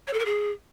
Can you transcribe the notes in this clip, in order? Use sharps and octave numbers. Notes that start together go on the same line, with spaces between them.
C#5
A4
A#4
G#4